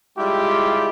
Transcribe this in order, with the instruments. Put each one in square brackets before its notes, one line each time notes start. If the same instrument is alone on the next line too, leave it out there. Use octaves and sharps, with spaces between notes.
[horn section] G3 G#3 E4 F4 G4